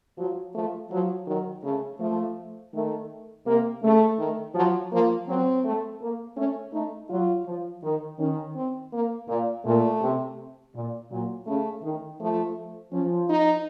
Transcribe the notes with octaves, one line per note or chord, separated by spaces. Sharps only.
F3 F#3
F3 A3
F3 F#3
D#3 F#3
C#3 A3
F3 A3
D#3 A3
C3 A#3
C#3 A3
D#3
F3 F#3
F3 A#3
F#3 C4
A3
A#3
A3 C#4
A3 D#4
F#3 F4
F3
D#3 D#4
D#3 C#4
C4
A#3
A#2 A#3
A#2 A3
C3
A#2
A#2 F#3
C#3 A3
D#3
F3 A3
F3 C#4
D#4